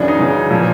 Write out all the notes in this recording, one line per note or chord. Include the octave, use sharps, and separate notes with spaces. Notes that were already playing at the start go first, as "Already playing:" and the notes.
Already playing: F#2 C#3 E3 D4
D#4
F#2 C#3 E3
A#2 F3